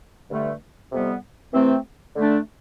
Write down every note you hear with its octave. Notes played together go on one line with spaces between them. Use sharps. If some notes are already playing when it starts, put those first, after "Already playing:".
G2 D3 A3
F2 C3 G3 B3
C3 E3 A3 C4
D3 A3 D4